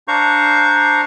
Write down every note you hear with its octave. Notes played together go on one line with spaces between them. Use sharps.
D4 C5 F5 A#5 C#6